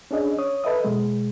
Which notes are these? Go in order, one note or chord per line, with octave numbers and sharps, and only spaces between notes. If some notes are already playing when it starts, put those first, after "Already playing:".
C#4 D4 G#4 D#5
C#5 D#6
A4 B4 D#5 E5 D#6
B2 G#3